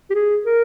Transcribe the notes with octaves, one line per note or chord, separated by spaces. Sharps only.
G4
G#4
A#4